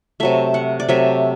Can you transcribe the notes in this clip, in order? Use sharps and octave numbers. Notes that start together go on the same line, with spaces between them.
C3 F#3 A3 E5
F#5
D5
C3 F#3 A3 E5